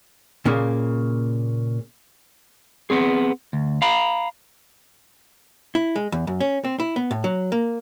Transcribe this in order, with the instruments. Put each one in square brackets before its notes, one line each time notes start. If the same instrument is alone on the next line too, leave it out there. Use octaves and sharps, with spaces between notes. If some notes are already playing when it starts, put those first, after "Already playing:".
[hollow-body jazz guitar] A#2 C#3 A#3
[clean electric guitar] B3 C4 G#4
D2
F5 A#5 B5
[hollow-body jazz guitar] E4
G#3
E2
F#2
C#4
C4
E4
B3
A2
F#3
A#3